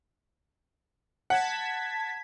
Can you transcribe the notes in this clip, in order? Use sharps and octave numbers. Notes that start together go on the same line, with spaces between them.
F#5 A5 G#6 B6